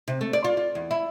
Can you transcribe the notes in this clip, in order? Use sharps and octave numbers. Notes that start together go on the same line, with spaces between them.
C3
A3
D5
F4
F4
E2
E4